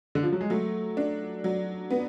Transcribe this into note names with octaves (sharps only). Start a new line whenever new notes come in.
D3
F3
F#3
G#3
F#3 A3
D4
F#3
B3